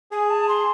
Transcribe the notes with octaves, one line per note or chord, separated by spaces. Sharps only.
G#4 G#5
A5
C6